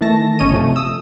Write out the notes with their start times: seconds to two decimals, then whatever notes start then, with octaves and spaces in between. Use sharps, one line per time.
0.01 D#3 E3 A3 A5 A#6
0.39 G1 C#4 C#5 D#5 D#7
0.52 C3 F3 A3
0.76 D#6 E6